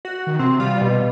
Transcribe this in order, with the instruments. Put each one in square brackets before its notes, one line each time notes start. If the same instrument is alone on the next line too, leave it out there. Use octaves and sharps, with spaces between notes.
[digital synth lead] F#4
[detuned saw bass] D#3
[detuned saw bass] C3 [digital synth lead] C4
[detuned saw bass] G3 [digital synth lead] F4
[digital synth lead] B2